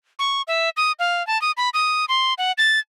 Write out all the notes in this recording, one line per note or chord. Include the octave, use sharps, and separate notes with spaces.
C#6
E5
D#6
F5
A5
D#6
B5
D#6
C6
F#5
A6